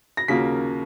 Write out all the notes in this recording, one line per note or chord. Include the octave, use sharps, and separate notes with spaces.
A#6
D#2 C#3 F#3 A#3 F4 B6